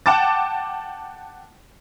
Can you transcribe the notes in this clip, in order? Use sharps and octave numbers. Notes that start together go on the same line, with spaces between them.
F#5 G5 A5 D6 A6